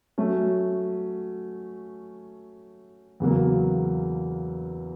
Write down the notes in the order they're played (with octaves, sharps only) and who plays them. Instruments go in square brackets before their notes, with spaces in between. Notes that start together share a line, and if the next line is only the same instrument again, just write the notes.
[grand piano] F#3 A3 C#4 F#4
E2 C#3 F#3 A#3